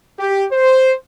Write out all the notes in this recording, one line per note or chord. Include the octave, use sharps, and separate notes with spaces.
G4
C5